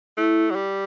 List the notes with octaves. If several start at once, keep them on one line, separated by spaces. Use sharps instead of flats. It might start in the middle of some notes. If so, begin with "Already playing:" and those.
A3 E4
F#3
G3